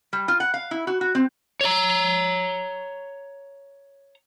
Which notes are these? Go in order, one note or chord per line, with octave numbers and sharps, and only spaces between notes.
G3
F4
F#5
F5
E4
F#4
F#4
C4
C#5 A#5